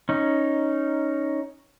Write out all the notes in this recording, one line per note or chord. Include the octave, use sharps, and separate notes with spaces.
C#4 D#4